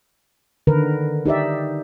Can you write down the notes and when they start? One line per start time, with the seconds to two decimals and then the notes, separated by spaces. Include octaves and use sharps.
0.67 D3 D#3 A#4 B4
1.26 D#4 G4 D5 E5